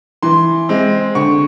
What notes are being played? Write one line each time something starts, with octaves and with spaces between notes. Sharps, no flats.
E3 C6
G#3 C4
D3 C#6